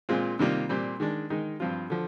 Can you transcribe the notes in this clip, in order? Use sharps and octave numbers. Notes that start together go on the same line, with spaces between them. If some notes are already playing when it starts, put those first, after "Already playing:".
A#2 G#3 C4 F4
C3 D#3 G3 A#3 F4
A#2 G3 C4
D#3 G#3 D4
D#3 G#3 D#4
G2 F3 C4 F4
D3 F3